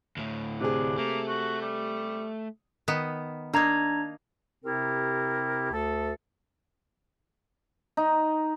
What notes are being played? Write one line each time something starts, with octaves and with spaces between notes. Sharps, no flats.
D2 A2
C3 D4 G#4
A3 A#3
F#4
G3
D#3 B3
A#3 D4 D#4 A#5 G#6
C3 C4 E4 G4 A#4
D2 A4
D#4